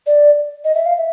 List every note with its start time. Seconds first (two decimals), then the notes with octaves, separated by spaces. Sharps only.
0.06 D5
0.64 D#5
0.75 E5
0.86 F5
0.97 E5